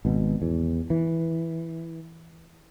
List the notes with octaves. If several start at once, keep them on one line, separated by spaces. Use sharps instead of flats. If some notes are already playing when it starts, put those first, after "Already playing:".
G#1 B2
E2
E3